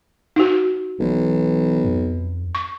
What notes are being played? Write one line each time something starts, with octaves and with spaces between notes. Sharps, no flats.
D#4 F#4
B1 E3
F2
C#6